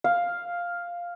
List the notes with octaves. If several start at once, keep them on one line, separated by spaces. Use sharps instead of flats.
F5